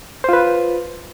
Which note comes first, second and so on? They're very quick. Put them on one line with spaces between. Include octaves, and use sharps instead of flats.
C5 F4 B4